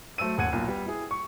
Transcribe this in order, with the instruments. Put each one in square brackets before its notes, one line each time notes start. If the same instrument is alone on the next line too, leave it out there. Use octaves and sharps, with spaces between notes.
[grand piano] F#3 A3 C5 E6 D#7
D#1 D#2 F#5 G#6 D#7
B1 A#2
G3 B3
E4 G#4
C#6